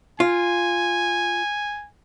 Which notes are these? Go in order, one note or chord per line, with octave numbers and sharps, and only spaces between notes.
F4 G#5